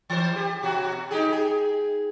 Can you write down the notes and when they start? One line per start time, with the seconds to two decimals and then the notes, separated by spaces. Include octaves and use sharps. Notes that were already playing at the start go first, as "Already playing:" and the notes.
0.10 E3 C5
0.36 G4
0.63 B2 F#4
1.11 D#4 G4 G#4
1.32 G#4